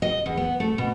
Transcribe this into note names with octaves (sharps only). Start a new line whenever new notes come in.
D#5
E2
B3
A3
B2